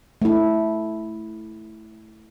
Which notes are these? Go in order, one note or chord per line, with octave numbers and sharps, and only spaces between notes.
A3 E4